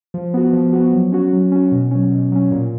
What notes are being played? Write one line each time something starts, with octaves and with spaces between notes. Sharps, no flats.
F3
B3 F#4
F3
B3 F#4
F#3
C#4 F#4
F#3
C#4 F#4
B2
F#3 C#4
B2
F#3 C#4
A#2